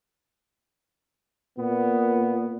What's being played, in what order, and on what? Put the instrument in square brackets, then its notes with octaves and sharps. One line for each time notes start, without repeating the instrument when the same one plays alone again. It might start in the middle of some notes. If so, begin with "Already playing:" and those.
[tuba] A#2 [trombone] B3